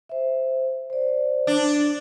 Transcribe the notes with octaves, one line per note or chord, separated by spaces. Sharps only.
C5 E5
C5 D5
D4